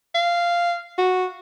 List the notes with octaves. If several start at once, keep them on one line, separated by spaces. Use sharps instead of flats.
F5
F#4